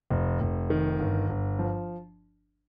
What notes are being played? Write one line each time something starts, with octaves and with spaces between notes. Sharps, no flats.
F1
F1
D#3
G1
G1
F3